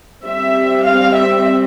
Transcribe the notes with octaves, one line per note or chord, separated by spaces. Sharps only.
G3 C4 E5
F5
E5